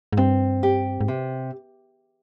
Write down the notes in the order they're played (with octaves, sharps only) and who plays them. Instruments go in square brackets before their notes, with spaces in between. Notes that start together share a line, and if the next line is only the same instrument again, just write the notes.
[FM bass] G#2
[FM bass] G2 [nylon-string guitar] C4
[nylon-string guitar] G4
[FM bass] G#2
[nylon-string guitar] C3